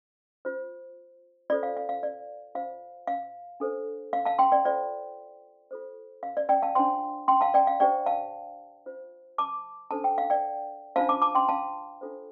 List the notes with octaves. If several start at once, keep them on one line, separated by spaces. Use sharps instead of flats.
F4 C5
F4 A4 C5 D5
F5
F5
F5
D5
F4 C5 F5
F5
D4 A4 C5
F5
F5 A5
G5 C6
D5 G5
F4 A4 C5 D5
F4 A4 C5
F5
D5
D5 G5
F5 A5
D4 F4 C5 G5 C6
G5 C6
F5 A5
D5 G5
F5
D4 G4 C5 D5 G5
F5 A5
F4 C5
A5 D6
D4 A4 C5 A5
G5
F5
D5 G5
D4 F4 C5 F5 A5
A5 D6
A5 D6
G5 C6
F5 A5
D4 F4 A4 C5